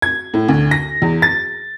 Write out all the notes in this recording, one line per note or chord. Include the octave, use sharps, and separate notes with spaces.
G#6
A2
D2
A#6
E2
A6